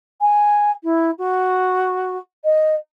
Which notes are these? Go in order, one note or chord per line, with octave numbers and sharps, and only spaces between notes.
G#5
E4
F#4
D#5